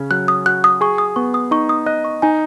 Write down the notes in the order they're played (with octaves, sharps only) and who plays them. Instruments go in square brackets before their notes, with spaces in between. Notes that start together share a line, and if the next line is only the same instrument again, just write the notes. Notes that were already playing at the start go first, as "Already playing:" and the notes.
Already playing: [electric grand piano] C#3 C#4
[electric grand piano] F#3 [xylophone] F#6
[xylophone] D#6
[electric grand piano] F#4 [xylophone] F#6
[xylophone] D#6
[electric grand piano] G#4 [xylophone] C#6
[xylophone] D#6
[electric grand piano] B3 [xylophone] C#6
[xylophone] D#6
[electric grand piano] D#4 [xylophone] C#6
[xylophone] D#6
[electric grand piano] D#5 [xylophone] F#6
[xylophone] C#6
[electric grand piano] D#4 [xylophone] G#5